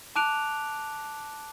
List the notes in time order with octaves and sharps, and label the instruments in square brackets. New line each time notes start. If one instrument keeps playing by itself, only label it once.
[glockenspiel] A5 D6 F#6 D7 F7